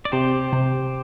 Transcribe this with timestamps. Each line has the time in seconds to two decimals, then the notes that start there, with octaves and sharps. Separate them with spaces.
0.05 D5
0.12 C3 G4 C5
0.52 C3